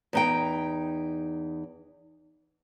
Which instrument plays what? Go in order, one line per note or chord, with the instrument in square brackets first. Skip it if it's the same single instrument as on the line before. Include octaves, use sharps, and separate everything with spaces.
[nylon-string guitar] E2 D#4 G5